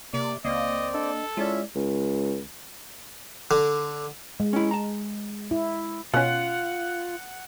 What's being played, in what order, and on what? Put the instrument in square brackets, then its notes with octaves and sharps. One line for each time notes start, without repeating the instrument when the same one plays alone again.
[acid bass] C3 [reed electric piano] A#3 [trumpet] D5
[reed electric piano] C#2 [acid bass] A#3 [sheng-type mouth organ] C4 D5 [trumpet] D#5
[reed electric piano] D4 D#5 [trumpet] A4
[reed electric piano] G#3 E4 D5 [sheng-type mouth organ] C#4 E5 [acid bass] F4
[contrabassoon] C#2
[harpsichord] D3
[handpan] G#3
[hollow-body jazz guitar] C#4 E4
A5 A#5
[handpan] E4
[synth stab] B2 C#4 [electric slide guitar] F4 [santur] F#5